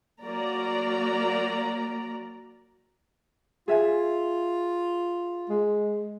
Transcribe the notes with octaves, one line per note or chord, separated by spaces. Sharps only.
F#3 A#3 F#4 D5 A#5
F4 G#4 E5 G#5
G#3